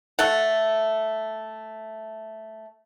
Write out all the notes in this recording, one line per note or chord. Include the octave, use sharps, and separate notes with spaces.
A3 A4 F#5